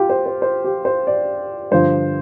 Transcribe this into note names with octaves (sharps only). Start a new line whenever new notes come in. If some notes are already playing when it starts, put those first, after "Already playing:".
Already playing: F4 G4
C5
C5
C5
G4
C5
D5
G2 D3 F3 C5